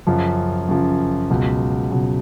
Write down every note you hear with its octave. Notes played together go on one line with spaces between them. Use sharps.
F#2 C#3 F3
F#2 C#3 F3
C#2 B2 F#3
C#2 B2 F#3